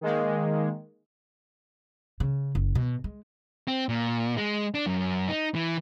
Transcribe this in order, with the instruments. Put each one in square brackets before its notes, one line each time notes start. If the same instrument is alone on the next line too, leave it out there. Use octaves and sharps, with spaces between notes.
[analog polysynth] D#3 G#3 A#3
[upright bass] C#3
F#1
B2
G#3
[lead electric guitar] C4
A#2
G#3
D4
F#2
D#4
E3